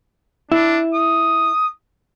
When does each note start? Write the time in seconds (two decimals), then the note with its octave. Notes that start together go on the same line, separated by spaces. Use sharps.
0.52 D4 E4
0.94 D#6